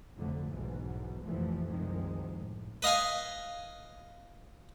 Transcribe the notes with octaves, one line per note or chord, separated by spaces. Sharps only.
F1 F2 D3 F#3 A3
B1 G#2 B2 E3
F1 A#1 A#2 E3 F3 A3
F#1 C2 D#3 F3 G#3
A2
B4 D#5 F5 G#5